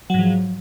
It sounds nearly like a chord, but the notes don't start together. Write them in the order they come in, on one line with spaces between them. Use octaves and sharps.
F#3 G#2 F3